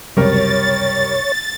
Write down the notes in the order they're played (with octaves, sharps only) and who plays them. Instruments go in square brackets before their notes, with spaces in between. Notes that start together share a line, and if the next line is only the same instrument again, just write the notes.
[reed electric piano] C#2 F#2 C3 [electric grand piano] G3 A#4 [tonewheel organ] C#5 [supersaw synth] A6